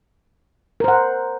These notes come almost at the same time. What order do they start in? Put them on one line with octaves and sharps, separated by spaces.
A#4 C5 F#5